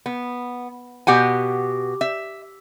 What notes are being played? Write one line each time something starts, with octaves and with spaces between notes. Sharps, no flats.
B3
B2 G4 F#5 G#5
E5